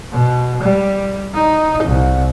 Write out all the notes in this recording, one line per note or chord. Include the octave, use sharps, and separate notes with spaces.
B2
G3
D#4
C2